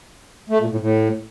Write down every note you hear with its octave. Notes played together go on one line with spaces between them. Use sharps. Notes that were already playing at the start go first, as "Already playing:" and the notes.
A3
A#2
A2
A2